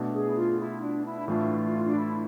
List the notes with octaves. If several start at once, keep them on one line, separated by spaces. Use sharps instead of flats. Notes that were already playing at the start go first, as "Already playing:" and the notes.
Already playing: B2 A3 D4
G#4
E4
F4
E4
D4
E4
A2 E3 A3 D4 F4
D4
E4